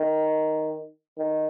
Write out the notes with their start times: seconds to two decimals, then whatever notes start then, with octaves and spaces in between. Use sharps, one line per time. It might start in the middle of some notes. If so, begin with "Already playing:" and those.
Already playing: D#3
1.18 D#3